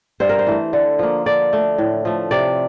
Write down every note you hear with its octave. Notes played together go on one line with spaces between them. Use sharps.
G2 C5
A#4
C5
E3 A3
D3
F3 A#3
D3 D5
A3
A2
F3 A3
C3 D5